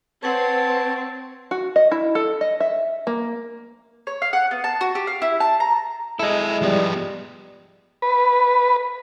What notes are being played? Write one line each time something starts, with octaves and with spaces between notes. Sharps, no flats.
C4 B4 C#5 F#5 A5
F#4
D#5
E4
A4
D#5
E5
A#3
C#5
F5
F#5
B3
A5
F#4
G4
F5
E4
A5
A#5
G#3 E4 A4 D#5
F3 G3 B3
B4